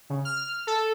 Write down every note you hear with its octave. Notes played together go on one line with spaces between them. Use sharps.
C#3
F6
A4